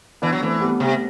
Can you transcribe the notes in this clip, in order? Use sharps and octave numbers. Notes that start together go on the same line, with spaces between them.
E3 B3 D4
F#3
E3 A3 C4
G3 B3
C3